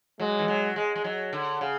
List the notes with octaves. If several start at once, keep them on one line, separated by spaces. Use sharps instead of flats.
F#3 G#3
E3
F#3
G#3
G#3
F#3
D3
C#3